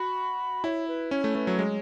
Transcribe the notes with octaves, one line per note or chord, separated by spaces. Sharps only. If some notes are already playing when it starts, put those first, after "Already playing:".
Already playing: F#4 B5
E4 C#5
B4
C#4 C#5
A3
A3 B4
F#3
G#3 C#5